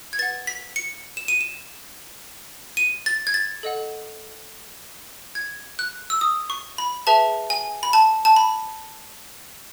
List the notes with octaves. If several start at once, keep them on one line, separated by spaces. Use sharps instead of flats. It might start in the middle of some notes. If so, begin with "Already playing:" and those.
G#6
B4 F#5 A6
B6
C#7
E7
D#7
E7
D#7
A6
G#6
A6
A4 D#5 F#5
G#6
F#6
E6
D#6
C#6
B5
G#4 B4 E5 A5
G#5
B5
A5
A5
B5